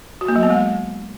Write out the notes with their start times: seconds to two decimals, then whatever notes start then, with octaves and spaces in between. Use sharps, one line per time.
0.21 F#4
0.28 A#3
0.36 F#3
0.43 B3
0.50 G#3